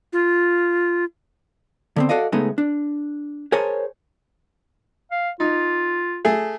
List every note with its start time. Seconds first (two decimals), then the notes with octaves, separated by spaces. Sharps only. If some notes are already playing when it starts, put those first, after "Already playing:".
0.13 F4
1.96 D3 B3 C4
2.09 F#4 A4 D5 D#5 F5
2.32 C#3 G#3 A3 B3 D#4 G#4
2.58 D4
3.52 G#4 A#4 C5 C#5 G#5 A5
5.11 F5
5.40 D#4 F4
6.25 A3 G#4